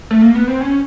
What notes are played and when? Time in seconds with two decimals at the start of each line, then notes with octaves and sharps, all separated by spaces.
0.11 A3
0.22 A#3
0.35 B3
0.48 C4
0.61 C#4